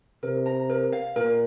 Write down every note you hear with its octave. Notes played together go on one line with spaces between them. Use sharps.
C3 A#4
A#5
A#4
F5
A#2 A#4